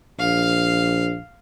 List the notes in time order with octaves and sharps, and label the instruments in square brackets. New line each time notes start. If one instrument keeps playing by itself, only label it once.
[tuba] A#1 [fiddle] F5